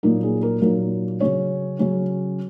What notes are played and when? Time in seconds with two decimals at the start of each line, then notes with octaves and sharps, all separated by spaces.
0.03 A#2 F#3 A#3 D#4 A#4
0.23 G#4
0.42 A#4
0.62 A#2 F#3 A#3 D#4 A#4
1.20 C#3 F#3 C#4 C#5
1.79 C#3 F#3 C#4